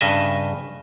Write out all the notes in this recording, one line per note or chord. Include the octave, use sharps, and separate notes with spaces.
G2 C#3 D#5 E5